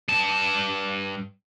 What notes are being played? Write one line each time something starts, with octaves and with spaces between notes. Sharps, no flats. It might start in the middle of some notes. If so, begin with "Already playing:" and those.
G2 A5